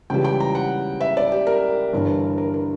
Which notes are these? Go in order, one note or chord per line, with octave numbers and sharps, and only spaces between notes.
C#2 C#3 E3 G3 G5
G5
A#5
F#5
E5
D5
G4
A#4
G1 G2 E3
A#4
A#4